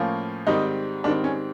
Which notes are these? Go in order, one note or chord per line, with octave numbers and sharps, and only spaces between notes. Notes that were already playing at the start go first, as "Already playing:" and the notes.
Already playing: A2 F3 A#3 C#4
G#2 D#3 G3 C4 D#4
G#2 D#3 G3 C4 D4
C#4